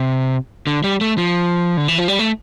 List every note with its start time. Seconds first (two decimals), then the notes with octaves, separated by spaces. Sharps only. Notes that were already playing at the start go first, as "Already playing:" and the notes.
Already playing: C3
0.67 D3
0.84 G3
1.01 A3
1.18 F3
1.77 D3
1.88 E3
1.98 F3
2.08 G3
2.19 A3